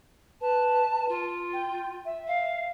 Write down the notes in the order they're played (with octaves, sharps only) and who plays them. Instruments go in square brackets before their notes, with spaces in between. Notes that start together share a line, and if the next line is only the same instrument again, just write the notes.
[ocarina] B4 [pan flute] A5
[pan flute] F4
[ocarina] G5
E5
[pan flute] F5